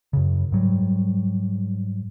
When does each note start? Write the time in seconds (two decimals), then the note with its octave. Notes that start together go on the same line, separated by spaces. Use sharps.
0.13 F#2 C#3
0.52 G#2 F#3 G3